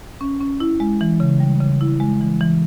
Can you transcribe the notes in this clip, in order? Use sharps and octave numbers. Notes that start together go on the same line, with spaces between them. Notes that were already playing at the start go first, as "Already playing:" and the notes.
C#4
C#4
E4
G#3
E3
C#3
G3
C#3
E4
G#3
E3
E3